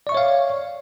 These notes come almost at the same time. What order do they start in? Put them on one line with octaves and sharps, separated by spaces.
D5 C#6 E5 C#5 F5